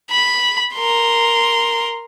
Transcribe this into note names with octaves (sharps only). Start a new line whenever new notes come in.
B5
A#4 C6